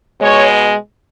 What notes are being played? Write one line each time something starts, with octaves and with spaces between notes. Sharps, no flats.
B2 G#3 C#5